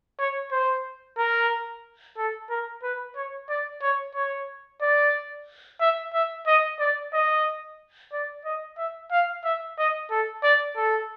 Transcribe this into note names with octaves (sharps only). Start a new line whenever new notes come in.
C#5
C5
A#4
A4
A#4
B4
C#5
D5
C#5
C#5
D5
E5
E5
D#5
D5
D#5
D5
D#5
E5
F5
E5
D#5
A4
D5
A4